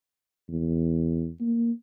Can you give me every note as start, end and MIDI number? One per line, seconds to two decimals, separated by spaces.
0.49 1.29 40
1.40 1.71 58